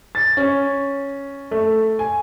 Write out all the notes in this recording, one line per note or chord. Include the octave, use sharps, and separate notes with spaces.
A6
C#4
A3
G#5